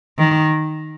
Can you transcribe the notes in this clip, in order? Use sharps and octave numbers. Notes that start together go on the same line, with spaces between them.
D#3